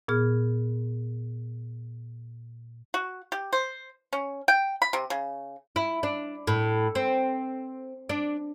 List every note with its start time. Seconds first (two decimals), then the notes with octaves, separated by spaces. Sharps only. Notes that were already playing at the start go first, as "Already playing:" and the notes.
0.08 A#2 B3 G#4 F6
2.94 F#4
3.32 G4
3.53 C5
4.13 C#4
4.48 G5
4.82 B5
4.93 C3
5.10 C#3
5.76 E4
6.03 D4
6.47 A2
6.95 C4
8.09 D4